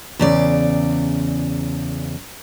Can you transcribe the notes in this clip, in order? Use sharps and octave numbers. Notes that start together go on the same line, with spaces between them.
E2 C#3 D5